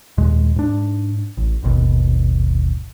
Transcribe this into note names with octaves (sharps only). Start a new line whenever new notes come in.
D#2 A#2 G#3
G#2 D4
A1
D#1 G#1 D#2 B2